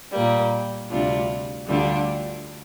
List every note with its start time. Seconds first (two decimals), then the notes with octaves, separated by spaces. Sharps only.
0.13 A#2 G3 A#3
0.91 D2 C3 G3 D4 F4
1.67 D2 D3 G3 D4 F4